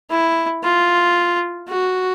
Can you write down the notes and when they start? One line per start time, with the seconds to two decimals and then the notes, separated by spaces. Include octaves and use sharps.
0.10 E4
0.63 F4
1.69 F#4